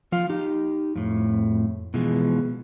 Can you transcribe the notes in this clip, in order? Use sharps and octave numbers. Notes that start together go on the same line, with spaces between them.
F3 F4 F5
D#4 G4
F2 A2
B2 E3 F3 G#3